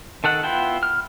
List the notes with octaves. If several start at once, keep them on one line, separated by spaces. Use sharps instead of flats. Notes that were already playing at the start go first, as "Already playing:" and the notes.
D#3 A4 F#5
B3 E4 F4 G5
F6